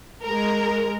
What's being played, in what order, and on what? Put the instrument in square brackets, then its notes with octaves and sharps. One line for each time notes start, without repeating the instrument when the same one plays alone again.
[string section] G#3 A#4